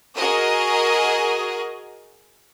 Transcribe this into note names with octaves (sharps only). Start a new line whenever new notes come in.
F#4 G#4 A#4 D#5